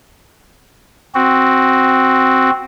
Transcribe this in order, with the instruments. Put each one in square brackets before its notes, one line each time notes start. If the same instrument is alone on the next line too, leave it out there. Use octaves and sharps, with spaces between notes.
[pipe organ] C4 F#4